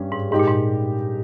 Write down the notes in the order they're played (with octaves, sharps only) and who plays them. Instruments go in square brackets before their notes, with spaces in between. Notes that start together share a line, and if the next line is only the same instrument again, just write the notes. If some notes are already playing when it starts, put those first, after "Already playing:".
Already playing: [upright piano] G2 G3 C#4 G4
[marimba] G#2
[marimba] G#2 [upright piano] G#3 D#4 G4
[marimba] A#2
G#2